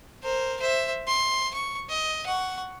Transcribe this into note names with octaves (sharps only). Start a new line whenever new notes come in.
A#4 C5
C5 E5
C6
C#6
D#5
F#5 C#6